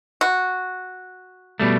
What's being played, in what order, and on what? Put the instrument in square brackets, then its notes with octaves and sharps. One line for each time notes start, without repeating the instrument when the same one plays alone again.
[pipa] F#4
[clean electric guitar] B2 G3 A3